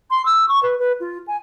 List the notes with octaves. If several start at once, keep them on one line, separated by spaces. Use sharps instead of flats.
C6
E6
C#6
B4
B4
F4
G#5